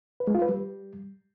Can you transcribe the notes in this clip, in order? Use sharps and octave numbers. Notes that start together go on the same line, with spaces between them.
B4
G#3
F4
B4
G3